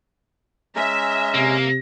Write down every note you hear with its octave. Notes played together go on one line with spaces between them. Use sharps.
G#3 C#4 E5 A#5
C3 A#3